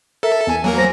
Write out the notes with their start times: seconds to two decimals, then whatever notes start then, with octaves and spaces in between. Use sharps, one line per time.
0.23 A4 A#4 E5
0.47 E2 G#5
0.64 F#3 A#3 A#4
0.78 C5 A#6